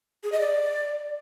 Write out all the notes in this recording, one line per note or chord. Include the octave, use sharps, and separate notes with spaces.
G#4
D#5
D5